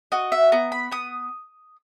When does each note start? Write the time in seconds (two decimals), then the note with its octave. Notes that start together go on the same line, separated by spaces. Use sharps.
0.12 F#4 D#5
0.32 E5
0.52 B3 A#5
0.72 B5
0.92 B3 D#6